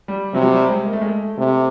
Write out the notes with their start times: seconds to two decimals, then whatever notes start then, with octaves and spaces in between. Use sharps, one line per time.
0.08 G3
0.34 C3 F#3
0.46 F#3
0.52 G3
0.69 G#3
0.87 A#3
0.93 A3
1.02 G#3
1.08 A3
1.38 C3 A3